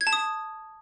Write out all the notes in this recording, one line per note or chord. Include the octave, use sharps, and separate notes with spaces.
G#6
A5
D#6